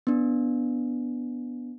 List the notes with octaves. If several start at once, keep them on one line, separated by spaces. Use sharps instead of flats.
B3 D4